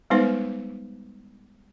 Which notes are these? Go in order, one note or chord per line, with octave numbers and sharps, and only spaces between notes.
G3 G#3 B3 D#4 B4 C5